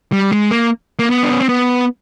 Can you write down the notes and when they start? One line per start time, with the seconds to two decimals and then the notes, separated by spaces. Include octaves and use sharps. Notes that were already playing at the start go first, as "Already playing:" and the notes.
0.12 G3
0.32 G#3
0.51 A#3
0.99 A#3
1.10 B3
1.23 D4
1.31 C#4
1.41 C4
1.49 B3